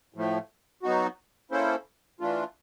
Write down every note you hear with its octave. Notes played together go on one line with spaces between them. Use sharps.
A2 F3 A3
F#3 B3 D#4 F#4
A#3 C#4 E4 A4 C5
E3 A3 D4 F4